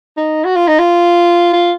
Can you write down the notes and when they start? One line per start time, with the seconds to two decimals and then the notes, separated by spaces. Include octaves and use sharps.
0.17 D#4
0.45 F#4
0.56 F4
0.68 D#4
0.79 F4
1.53 F4